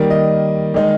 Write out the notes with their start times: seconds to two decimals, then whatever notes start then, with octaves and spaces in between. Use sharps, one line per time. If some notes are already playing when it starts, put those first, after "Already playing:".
Already playing: D#3 G3 A#3
0.10 D#5
0.74 D#3 G#3 D#4